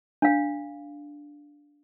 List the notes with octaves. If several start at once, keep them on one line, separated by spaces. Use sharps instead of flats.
D4 F5